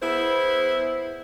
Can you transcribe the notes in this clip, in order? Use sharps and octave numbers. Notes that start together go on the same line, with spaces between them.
B3 E4 G#4 C5